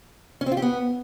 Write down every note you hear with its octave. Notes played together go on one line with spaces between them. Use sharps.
C#4
C4
F4
G4
B3